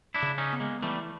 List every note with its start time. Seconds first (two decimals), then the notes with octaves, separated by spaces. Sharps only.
0.14 D4 E4
0.22 C#3
0.38 C#4 D#4
0.53 B3
0.60 G#3 A#3
0.82 E3 G3 A3